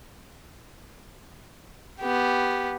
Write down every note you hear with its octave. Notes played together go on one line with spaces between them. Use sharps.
B3 G4